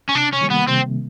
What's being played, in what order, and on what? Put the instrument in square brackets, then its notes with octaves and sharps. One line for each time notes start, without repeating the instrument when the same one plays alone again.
[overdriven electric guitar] C#4
[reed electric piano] C3 [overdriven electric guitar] D4
[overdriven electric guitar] C#4
[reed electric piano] D#3 G3 A#3
[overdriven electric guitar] B3
[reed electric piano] C3 [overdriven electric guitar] C4